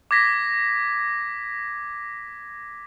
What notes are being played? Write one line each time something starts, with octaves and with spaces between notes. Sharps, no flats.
D6 G#6 A#6 B6